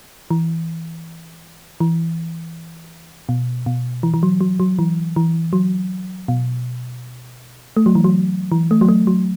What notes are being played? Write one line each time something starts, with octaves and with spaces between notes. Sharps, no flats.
E3
E3
B2
B2
E3
E3
F#3
F#3
F#3
E3
E3
F#3
B2
A3
F#3
E3
F#3
E3
A3
F#3
A3
F#3